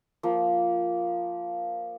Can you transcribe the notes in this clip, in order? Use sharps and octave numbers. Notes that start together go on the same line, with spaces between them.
F3 A#3